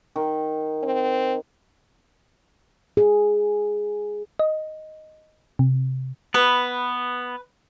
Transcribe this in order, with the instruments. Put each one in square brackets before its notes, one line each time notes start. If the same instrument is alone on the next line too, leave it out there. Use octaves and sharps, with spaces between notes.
[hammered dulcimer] D#3
[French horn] C4
[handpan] G#4
[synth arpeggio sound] D#5
C3
[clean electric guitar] B3 [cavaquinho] B4